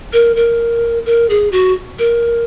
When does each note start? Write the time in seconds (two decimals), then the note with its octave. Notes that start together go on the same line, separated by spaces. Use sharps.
0.13 A#4
0.36 A#4
1.06 A#4
1.30 G#4
1.52 F#4
1.99 A#4